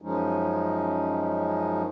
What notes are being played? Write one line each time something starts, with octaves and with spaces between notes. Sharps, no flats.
F#2 F3 G#3 C#4 D#4